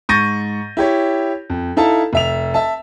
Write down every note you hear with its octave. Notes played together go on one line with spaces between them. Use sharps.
G#2 C#6 G6 A6 A#6 D#7
E4 G4 C#5
F2
D#4 E4 A4 F5 A5
F1 E5 F7
E5 A5